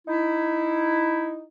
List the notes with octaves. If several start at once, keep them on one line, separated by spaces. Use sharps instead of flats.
D#4 E4